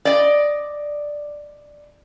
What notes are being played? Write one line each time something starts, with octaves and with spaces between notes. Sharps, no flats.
D5 D#5